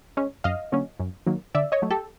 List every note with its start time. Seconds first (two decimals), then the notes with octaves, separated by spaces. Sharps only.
0.17 G#3 C#4
0.44 F#2 D#5 F5
0.72 D3 F#3 A#3 C#4
1.00 F#2
1.26 D#3 F#3 A#3
1.55 D3 D5 E5
1.72 C#5 D#5
1.82 F#3 A3
1.91 G4 A4